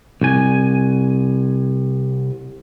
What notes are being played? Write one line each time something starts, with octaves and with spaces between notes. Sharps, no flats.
C2 G#5